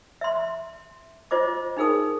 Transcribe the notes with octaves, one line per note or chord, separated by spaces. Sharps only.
E5 C6
F4 C5 D#5 D6
D4 D#4 G#4 A#4 D#6